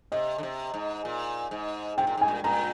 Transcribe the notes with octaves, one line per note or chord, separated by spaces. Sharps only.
C3 D#5
D3
C3
G#2
A#2
G#2
C3 G5
A#2
G#2 G#5
A#2
A#2 A#5